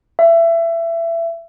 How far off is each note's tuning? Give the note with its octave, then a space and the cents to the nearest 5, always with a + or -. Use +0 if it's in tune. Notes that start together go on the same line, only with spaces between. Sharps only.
E5 +25